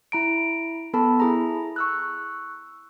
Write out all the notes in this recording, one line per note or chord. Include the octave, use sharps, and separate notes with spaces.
E4 A#5 D7
B3 A4 A5 B5
E4 G#4 A#5
C#6 E6 F#6